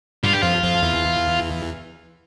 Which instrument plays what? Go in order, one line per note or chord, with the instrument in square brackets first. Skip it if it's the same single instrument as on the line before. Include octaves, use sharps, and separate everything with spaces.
[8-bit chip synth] G2 G3 [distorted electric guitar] F4
[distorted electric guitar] G4
[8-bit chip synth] F2 F3 [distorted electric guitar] F4
[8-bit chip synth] F2 F3
E2 E3